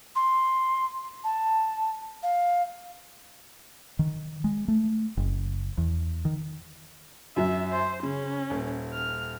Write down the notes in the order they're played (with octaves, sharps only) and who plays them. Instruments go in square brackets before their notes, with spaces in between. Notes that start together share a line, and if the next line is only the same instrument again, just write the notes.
[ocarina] C6
A5
F5
[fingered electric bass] D#3
G#3
A3
F#1
E2
D#3
[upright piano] F#2 F#3 [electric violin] E5
[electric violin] C5 C6
[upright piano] C#3 [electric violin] C#4
[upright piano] D#1
[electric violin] F6